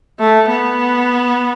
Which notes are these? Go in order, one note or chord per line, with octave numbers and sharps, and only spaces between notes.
A3
B3